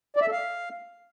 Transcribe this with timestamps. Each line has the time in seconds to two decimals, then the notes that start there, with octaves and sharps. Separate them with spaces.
0.16 D5
0.21 E5
0.27 A4
0.32 F5